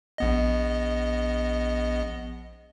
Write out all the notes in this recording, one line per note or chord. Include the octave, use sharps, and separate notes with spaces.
A#1 B3 D#5